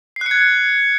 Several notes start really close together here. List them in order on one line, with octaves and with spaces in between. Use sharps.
C7 F#6 C#7 G#6